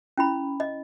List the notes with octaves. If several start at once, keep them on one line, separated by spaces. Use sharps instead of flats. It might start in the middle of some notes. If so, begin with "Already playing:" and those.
C#4 E4 B5
D#5